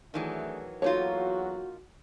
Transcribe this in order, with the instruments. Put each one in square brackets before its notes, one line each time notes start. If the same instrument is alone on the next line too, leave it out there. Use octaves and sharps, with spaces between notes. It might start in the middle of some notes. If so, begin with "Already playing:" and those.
[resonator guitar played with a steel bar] D#3 E3 F#3 [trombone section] A3 D4 G#4
[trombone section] E2 F#3 [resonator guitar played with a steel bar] A#3 D#4 F4 [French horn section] F#4 [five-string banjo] A4 C#5